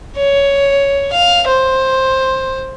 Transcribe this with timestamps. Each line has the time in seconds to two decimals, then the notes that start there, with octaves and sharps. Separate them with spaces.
0.17 C#5
1.13 F5
1.47 C5